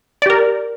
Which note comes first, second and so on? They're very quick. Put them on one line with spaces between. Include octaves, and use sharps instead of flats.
D5 G4 A#4